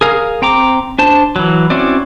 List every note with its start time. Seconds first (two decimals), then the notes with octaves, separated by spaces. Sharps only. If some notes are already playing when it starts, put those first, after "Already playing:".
0.01 G#4 A#4 F5
0.42 C4 G5 A#5 D6
0.99 D4 C5 A5
1.36 E3 F#3
1.70 C4 C#4 E4 F#4 D5